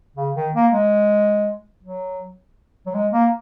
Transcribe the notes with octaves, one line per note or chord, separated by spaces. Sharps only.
C#3
D#3
A#3
G#3
F#3
F#3
G#3
A#3